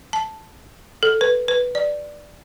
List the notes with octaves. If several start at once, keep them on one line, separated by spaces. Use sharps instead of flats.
A5
A4
B4
B4
D5